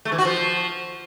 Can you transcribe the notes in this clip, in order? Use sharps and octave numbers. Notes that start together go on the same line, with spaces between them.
A3
E3
F#4
F3